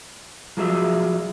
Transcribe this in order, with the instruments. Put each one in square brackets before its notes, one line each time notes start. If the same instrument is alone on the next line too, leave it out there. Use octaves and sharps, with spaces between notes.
[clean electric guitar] F3 F#3 G#4 E5